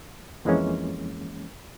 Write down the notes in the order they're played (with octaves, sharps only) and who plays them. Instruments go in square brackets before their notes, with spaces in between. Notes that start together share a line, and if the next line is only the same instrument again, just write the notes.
[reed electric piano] F2 E3 G#3 A#3 C#4